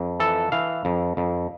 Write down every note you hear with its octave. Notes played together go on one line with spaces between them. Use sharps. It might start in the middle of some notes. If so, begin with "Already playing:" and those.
Already playing: F2
E3 A4
E3 F5
F2
F2